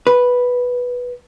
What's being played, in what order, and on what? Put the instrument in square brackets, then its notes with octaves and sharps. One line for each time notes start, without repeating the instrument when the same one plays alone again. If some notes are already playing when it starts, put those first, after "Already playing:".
[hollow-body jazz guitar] B4